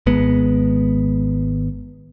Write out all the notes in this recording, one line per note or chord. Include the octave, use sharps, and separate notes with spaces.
G#1 G#3 B3